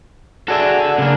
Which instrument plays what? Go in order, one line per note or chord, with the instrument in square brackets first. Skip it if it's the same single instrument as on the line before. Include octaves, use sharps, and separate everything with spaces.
[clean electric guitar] F#4 G#4 E5 [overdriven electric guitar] A4 D5
[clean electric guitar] C#3 A#3 [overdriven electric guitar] D4